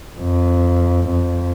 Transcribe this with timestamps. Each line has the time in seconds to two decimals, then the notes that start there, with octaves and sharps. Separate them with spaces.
0.20 F2
1.10 F2